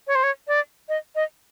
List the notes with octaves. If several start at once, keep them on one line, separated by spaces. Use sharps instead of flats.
C#5
C5
C#5
D5
D#5
D#5